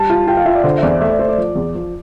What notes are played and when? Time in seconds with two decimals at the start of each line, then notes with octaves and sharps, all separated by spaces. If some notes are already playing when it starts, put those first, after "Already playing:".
Already playing: G3 A5
0.10 F4
0.27 F4 G5
0.37 F5
0.46 F4 E5
0.55 D5
0.64 D3 C5
0.78 E5
0.83 E2 D5
1.01 A3 E5
1.10 D5
1.19 A3 C5
1.28 D5
1.38 F3
1.55 E2
1.74 F3